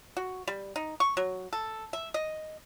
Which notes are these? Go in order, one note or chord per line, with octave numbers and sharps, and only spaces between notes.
F#4
G3
D#4
C#6
F#3
A4
E5
D#5